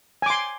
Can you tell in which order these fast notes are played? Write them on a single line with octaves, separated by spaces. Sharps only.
G#5 D6 C6